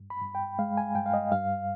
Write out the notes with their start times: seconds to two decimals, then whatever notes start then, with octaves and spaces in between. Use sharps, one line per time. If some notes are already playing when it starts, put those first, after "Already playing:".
Already playing: G2
0.10 B5
0.22 G2
0.35 G5
0.59 G#3 F5
0.77 G#5
0.95 G2 G5
1.06 F5
1.13 D#5
1.32 G2 F5